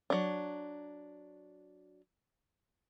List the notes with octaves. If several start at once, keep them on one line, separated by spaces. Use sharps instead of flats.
F#3 D4